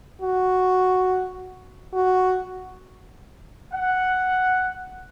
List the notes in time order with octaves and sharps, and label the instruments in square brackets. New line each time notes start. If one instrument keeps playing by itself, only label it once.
[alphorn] F#4
F#4
[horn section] F#5